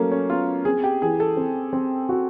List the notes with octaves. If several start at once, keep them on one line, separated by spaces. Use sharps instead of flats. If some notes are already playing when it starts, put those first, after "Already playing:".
Already playing: F#3 A3 A#3 C#4
C#4
B3 F4
C4 G#4
G4
E3 G#4
A4
C4
C4
F#4